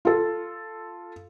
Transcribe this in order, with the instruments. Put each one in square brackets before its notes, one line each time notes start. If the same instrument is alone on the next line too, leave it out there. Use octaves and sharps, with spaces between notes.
[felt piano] F4 A4